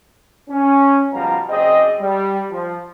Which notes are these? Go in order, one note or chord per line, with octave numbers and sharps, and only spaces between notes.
C#4
F#1 B2 F3 G3 F5 A#5
F#1 C4 G#4 D5 D#5
G3
F3